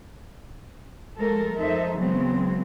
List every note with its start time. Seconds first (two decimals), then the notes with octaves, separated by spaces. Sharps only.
1.18 F3 G#3 A3 A4 A#4
1.57 F2 F3 D#4 A4 C5 E5
1.97 C#3 E3 F#3 G#3 B3 C4